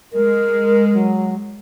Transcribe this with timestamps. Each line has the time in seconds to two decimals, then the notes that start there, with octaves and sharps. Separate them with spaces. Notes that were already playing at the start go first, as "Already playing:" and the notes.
0.13 G#3 A#4
0.93 F#3